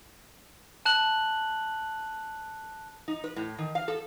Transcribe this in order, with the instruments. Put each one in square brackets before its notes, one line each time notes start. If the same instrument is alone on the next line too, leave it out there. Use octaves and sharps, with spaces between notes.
[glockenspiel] A5 F#6 F#7
[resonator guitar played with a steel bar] D#4
B4
A2
D#3
F5
A4